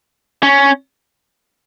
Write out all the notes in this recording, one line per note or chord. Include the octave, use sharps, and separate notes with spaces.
C#4